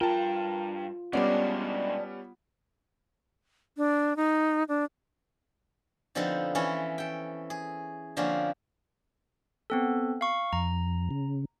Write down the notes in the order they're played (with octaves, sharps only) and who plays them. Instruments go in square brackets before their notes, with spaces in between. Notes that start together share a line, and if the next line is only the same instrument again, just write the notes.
[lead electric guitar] G2 G5 [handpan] F4 [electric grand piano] A#4 A5
[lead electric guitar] B2 G#3 [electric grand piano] G3 B3 C#4 [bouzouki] D4 D5 [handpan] F#5
[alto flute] D4
D#4
D4
[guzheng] D3 F3 B3 C4 D#4 A4
E3 C#4 E4 A4
A4 G5
G#4
D3 F3 A#3 C4 C#4
[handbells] B3 C4 A4
F5 C#6
[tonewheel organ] F2 [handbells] A#5
[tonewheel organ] C#3